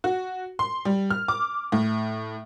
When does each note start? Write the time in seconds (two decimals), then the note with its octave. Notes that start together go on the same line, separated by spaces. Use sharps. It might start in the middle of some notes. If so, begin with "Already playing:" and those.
0.04 F#4
0.59 C6
0.85 G3
1.10 F6
1.28 D6
1.72 A2